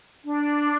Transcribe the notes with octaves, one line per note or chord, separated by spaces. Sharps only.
D4